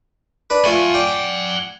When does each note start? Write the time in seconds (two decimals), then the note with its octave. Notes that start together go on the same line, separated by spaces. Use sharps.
0.50 D4 B4
0.65 A3 F4 F#5 G#5
0.94 D5 G5